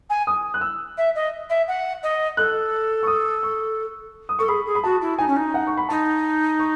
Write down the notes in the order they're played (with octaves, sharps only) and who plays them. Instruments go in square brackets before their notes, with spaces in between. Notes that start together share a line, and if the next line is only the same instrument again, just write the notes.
[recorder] G#5
[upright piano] D#6
F#6
E6
[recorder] E5
D#5
E5
F#5
D#5
[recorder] A4 [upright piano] F#6
[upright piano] C#6
D#6
C#6
D#6
[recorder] A4 [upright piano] C#6
[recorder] G#4 [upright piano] B5
[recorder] G#4
[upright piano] B5
[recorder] F#4 [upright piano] A5
[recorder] E4
[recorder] D#4 [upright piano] G#5
[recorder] C#4
D#4
[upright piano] F#5
C#6
B5
[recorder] D#4 [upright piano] A5
[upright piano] C#6